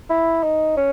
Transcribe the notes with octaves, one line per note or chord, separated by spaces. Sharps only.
E4
D#4
C#4